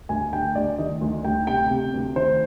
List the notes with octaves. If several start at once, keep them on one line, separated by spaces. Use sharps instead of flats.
D2 G#5
D3 G5
D2 D5
D#3 D#5
D2
D2 G5
C3 G5
C3
D2
D#3 C5